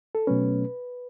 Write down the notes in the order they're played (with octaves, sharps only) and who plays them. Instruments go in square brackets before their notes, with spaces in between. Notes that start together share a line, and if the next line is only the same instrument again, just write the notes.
[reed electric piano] A4
B2 F#3 A3 C#4 B4